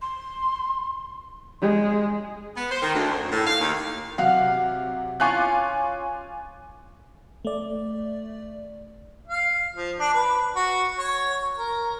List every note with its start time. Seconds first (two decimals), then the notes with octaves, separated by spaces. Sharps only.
0.02 C6
1.62 G#3
2.57 B3
2.71 C5
2.82 D#3
2.95 D2
3.11 F#2
3.32 A2
3.47 F5
3.60 D#2
4.18 C3 F#3 F5 F#5 F6
5.20 C#4 F4 G#5 C#6 D6 F#6
7.45 A3 D5
9.28 F5
9.76 F3
10.00 D4
10.14 B4
10.56 F#4
10.99 C#5
11.58 A#4